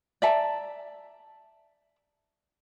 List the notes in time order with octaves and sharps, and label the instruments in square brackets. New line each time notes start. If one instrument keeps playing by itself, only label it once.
[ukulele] D5 E5 A5 A#5